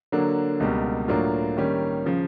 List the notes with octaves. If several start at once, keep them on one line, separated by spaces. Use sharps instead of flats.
D3 F#3 A#3 D4
C#2 B2 G3 A#3
A2 F#3 A#3 D4 F4
D#3 G3 A#3 C#4
C#3 F3